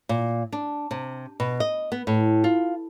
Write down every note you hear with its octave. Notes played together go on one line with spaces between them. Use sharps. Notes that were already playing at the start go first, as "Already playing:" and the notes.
A#2
D4
C3
B2
D#5
B3
A2
F4